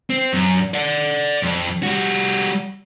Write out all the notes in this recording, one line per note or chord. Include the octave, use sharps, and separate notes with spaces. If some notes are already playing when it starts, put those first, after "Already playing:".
C4
F#2
D5 F#5
F2
G3 F#4